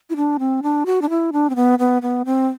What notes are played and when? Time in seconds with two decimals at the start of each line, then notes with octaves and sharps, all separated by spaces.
0.10 E4
0.16 D4
0.39 C4
0.63 D4
0.86 F#4
1.02 D4
1.10 E4
1.33 D4
1.50 C4
1.56 B3
1.79 B3
2.02 B3
2.25 C4